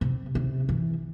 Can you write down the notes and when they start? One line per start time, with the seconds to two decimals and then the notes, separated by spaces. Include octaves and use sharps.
0.01 C3
0.35 C3
0.69 E3